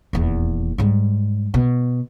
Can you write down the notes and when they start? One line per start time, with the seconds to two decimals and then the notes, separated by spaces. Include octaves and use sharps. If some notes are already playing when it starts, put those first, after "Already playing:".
0.13 D#1 E2
0.78 G#2 G3
1.54 B2